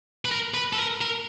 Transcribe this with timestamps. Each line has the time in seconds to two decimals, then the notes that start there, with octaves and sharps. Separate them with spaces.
0.25 B4
0.31 A#4
0.54 B4
0.73 A4
0.78 A#4
1.01 A#4